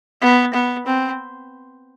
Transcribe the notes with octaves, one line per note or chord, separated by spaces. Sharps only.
B3
B3
C4